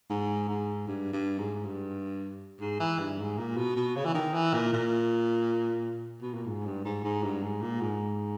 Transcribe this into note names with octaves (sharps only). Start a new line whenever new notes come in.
G#2
G#2
G2
G2
G#2
G2
G#2
E3
G2
G#2
A#2
B2
B2
C#3
E3
D#3
E3
A#2
A#2
B2
A#2
G#2
G2
G#2
G#2
G2
G#2
A#2
G#2